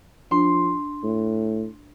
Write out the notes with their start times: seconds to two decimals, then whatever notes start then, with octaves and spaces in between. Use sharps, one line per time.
0.31 F3 D4 C6
1.04 A2